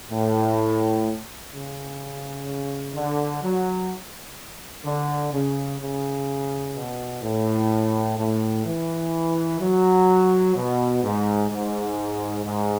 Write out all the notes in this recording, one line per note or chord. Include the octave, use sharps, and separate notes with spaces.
A2
C#3
D3
F#3
D3
C#3
C#3
B2
A2
A2
E3
F#3
B2
G#2
G#2
G#2